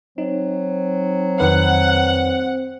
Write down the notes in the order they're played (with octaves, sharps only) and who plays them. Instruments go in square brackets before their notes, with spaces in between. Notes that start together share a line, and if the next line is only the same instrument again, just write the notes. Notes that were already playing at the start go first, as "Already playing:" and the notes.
[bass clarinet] F#3 [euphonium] C4 [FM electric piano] D#4
[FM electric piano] F2 D#3 B4 [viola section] F#5